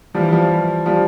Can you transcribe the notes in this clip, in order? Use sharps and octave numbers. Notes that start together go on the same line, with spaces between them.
E3 F3 G3
F3 G3
F3 G3